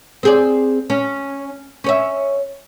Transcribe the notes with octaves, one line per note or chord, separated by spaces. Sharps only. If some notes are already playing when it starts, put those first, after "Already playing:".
C4 G#4 D5
C#4
C#4 C#5 E5